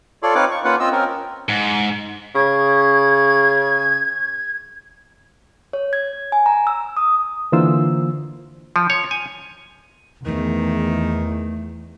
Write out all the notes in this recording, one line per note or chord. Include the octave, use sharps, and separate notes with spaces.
F4 A4 C#5 D5 C6
C4 D#4 B4 C#5 F5 D6
C#6
A#3 C#4 F4 B4 F5 F#5
C4 F4 D#5 E6
C4 C#4 A#4
G#2
C#3 G#6
C#5
G#6
G#5
A#5
E6
D#6
D3 E3 A#3 F4 C5 E6
F3
C#5
G#5
E2 D#3 A3